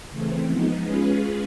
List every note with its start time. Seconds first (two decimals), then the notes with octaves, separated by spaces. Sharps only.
0.11 C#3 E3 A3 C4
0.48 F3 G#3 B3 D#4
0.85 G#3 C#4 F4 G#4 B4